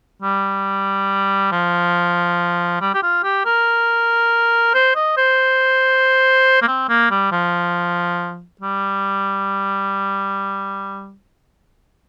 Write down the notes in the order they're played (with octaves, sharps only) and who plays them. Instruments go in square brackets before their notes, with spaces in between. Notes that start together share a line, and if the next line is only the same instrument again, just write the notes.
[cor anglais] G3
F3
G3
G4
F4
G4
A#4
C5
D#5
C5
A#3
C4
A#3
G3
F3
G3